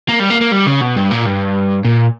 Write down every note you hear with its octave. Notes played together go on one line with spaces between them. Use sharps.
A#3
G3
A#3
A#3
G3
C#3
B2
G2
A#2
G2
A#2